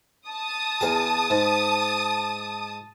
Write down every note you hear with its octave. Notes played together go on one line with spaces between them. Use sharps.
A5 D#6
E2 G#4
G#2